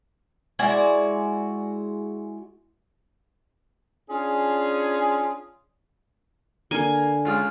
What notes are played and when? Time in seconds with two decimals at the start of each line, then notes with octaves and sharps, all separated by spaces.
0.59 G#3 E4 F#4 D5
4.10 C#4 D4 F4 G#4
6.71 D3 A#3 G#5
7.25 C#2 F4 G#4